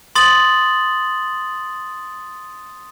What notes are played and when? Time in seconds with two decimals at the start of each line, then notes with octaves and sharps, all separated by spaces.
0.15 C6 D#6 A6 F#7